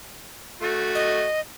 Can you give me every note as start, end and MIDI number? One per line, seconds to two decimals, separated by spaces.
0.62 1.25 57
0.62 1.25 66
0.95 1.40 75